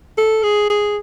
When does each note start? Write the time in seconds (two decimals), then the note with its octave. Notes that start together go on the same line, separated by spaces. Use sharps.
0.18 A4
0.43 G#4
0.70 G#4